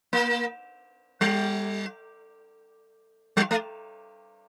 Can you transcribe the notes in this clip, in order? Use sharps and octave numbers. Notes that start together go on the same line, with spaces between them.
A#3
G3
G3
A3